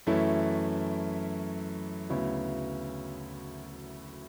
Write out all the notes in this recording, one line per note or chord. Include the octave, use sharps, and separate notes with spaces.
F#2 E3 A3 C#4 E4
D2 C#3 F#3 B3 E4